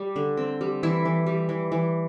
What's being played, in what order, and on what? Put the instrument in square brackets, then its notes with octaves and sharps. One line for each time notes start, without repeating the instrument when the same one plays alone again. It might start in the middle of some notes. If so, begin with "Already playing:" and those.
Already playing: [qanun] G3
D3
C4
G3
E3 E4
E3
G3
E3
E3